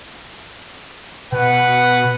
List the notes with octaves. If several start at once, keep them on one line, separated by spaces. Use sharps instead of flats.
B2 B4 F#5